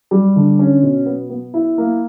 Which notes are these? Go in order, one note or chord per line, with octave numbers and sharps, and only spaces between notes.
G3
D3
C#4
B2
B3
B3
E4
A#3